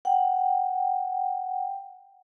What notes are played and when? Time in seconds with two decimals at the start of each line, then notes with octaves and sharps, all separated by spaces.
0.05 F#5 G5